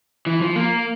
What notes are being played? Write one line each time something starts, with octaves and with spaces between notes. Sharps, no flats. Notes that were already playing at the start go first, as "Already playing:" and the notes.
E3
F3
A#3